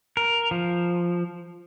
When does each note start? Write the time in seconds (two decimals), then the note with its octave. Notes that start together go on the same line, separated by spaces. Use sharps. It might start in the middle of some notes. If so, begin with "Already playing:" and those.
0.17 A#4
0.51 F3